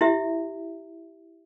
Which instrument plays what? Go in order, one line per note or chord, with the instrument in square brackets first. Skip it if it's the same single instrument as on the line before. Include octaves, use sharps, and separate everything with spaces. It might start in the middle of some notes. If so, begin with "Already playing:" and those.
[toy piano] E4 G4 E5